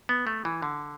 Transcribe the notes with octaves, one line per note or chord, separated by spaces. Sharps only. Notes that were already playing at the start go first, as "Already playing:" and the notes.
B3
A3
E3
D3